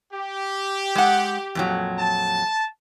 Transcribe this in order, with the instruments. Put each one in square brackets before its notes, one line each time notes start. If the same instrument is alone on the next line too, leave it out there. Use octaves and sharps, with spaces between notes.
[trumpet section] G4
[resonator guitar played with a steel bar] G#3 F#5
F2 A#2 F#3
[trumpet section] A5